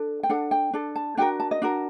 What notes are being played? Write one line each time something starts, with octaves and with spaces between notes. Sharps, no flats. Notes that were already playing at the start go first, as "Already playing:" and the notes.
Already playing: D4 A4
G5
D4 A4 F#5
G5
D4 A4
A5
D4 F#4 A#4 G5
A5
D#5
D4 F#4 A#4